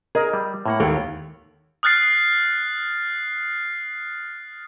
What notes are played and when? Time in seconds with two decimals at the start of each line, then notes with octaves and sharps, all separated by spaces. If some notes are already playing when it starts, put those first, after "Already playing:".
0.15 G#4 A#4 D#5
0.33 G3
0.66 A2 A#3 F#5
0.80 D#2 A4 C#5 F#5 G5
1.83 D#6 F6 F#6 A6 C7